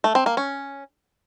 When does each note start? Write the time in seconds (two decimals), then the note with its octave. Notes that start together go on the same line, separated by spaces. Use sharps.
0.04 A3
0.15 C4
0.26 A#3
0.37 C#4